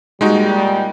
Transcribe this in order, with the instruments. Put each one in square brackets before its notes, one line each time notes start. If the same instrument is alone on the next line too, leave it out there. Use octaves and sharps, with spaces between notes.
[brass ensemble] A#2 G3 [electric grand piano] G#3 D#4 F#4